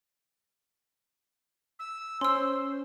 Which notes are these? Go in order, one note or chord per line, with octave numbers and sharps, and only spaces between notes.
E6
C#4 C5 C6 E6